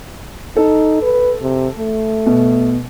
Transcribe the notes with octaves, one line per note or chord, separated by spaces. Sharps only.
D#4 A4
B4
C3
A3
B2